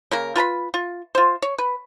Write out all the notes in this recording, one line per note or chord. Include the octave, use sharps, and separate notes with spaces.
C#3 A#3 A#4
F4 B4 A#5 B5
F4
F4 C5
C#5
B4